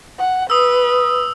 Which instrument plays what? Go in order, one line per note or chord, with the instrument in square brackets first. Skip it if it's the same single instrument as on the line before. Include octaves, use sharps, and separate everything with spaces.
[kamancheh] F#5
[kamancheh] B4 [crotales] D#6 E6